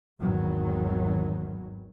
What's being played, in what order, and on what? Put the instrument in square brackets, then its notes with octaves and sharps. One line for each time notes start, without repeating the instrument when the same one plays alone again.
[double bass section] G#1 E2 D#3 F#3